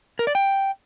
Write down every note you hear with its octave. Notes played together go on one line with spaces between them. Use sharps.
A#4
D5
G5